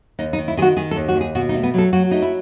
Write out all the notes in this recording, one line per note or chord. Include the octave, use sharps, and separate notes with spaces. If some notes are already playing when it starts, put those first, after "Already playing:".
D#2 D#4
D#4
D#3
E4
D#3 F#4 G#4
D#3 G#4
A4
D#2
F#4
D#2
G#4
B2 F#4
D#4
A3
B3
F#3 A4
F#3 F#4
A3 D#4
E4